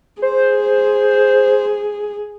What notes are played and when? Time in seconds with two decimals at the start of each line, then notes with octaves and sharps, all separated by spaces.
0.22 G#4 C5